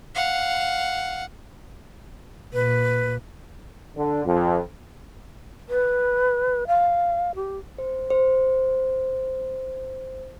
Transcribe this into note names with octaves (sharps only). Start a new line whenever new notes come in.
F5 F#5
A#2 B4
D3
F2
B4
F5
G4
C5
C5